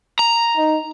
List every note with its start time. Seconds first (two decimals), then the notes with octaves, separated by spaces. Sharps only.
0.19 A#5
0.57 D#4